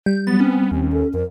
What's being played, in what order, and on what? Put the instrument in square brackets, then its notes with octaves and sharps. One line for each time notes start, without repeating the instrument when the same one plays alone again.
[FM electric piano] G3 [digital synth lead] G6
[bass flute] F#3 [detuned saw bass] B3 [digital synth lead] A6
[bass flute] C4 [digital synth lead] C#4
[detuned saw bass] D#2 [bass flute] C4
[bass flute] A4
[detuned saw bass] F2 [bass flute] A#4